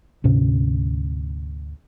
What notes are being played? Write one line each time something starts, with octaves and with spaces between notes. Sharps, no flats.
D2 G#2 C3 C#4